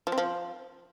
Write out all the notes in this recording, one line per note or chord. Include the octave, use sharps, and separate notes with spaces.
F3
C4
F3